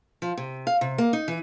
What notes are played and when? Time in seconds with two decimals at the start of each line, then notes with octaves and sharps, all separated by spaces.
0.22 F3
0.37 C3
0.67 F5
0.81 C3
0.98 A#3
1.13 D#4
1.28 E3